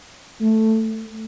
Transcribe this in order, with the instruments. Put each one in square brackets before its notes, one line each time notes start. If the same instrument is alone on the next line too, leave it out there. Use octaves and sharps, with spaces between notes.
[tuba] A3